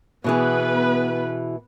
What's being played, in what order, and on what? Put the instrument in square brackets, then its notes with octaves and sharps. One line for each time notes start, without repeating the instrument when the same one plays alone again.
[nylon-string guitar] B2 E3 G#4 [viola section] B3 B4